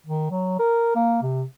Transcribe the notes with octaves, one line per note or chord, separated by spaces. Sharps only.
D#3
F#3
A#4
A#3
C3